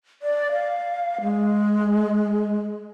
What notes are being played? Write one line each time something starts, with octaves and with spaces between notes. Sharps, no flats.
D5
F5
G#3